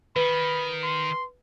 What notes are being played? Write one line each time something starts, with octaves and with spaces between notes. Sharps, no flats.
D#3 B4 B5
C6